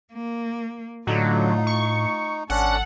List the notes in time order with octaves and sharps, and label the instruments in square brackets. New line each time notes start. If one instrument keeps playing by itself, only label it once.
[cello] A#3
[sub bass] A2 [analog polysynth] D3 F#3 [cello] A3 F4 [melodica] D#4
[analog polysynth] C#6
[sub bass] G#1 [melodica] C#4 D4 [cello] A4 [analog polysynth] F#5